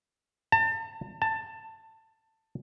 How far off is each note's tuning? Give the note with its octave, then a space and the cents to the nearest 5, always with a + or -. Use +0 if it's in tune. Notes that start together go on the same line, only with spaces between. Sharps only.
A5 +35
A5 +15